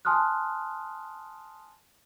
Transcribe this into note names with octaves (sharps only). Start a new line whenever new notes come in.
G#5 A5 C6 D#6 F6 F#6